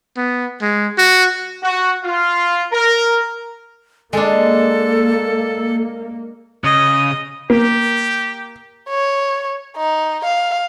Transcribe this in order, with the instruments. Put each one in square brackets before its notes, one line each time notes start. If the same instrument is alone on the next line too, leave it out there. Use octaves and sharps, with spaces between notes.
[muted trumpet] B3
G#3
F#4
[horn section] F#4
F4
A#4
[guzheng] G#3 D4 [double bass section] A#3 [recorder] A4
[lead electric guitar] C#3 [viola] D#5 [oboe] D#6
[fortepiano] A#3 [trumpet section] G4
[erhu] C#5
D#4
F5